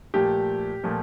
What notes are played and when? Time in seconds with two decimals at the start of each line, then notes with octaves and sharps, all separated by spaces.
0.14 A#2 F3 A3 G4
0.84 A#2 F3 A3